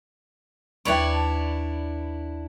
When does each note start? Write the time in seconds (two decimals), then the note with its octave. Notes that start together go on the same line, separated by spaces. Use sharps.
0.85 D#2 D4 E4 B4 C#5 D5 G5
1.13 A5